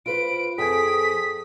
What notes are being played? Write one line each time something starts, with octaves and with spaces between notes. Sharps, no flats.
F4 B4 C5 D7
F2 G#4 A4 G5 G#5 D#6 B6